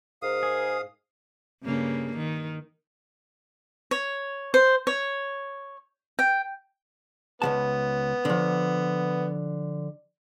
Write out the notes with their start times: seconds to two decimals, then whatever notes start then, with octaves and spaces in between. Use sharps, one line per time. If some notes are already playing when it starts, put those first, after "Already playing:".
0.22 G#2 A#4 F5 D#6
0.43 G#4
1.63 G2 C#3 A#3
2.17 D#3
3.91 C#5
4.54 C5
4.87 C#5
6.19 G5
7.42 C#2 F#3 B3 A5
8.25 D3 F3